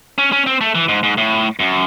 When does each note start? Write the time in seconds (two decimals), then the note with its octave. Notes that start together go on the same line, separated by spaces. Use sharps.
0.18 C#4
0.32 C#4
0.46 C4
0.61 A3
0.75 E3
0.88 G#2
1.03 G#2
1.17 A2
1.60 F#2